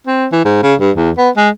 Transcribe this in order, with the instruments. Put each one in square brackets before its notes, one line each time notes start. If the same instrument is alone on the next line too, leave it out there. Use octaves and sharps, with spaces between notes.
[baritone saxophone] C4
E3
G#2
C#3
G2
E2
B3
G#3